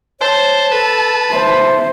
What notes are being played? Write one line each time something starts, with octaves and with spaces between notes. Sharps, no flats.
C5 C#5 A5
A4 B4
C5 E5